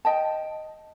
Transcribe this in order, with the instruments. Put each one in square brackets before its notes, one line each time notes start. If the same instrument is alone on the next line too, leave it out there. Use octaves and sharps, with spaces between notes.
[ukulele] D#5 G5 A5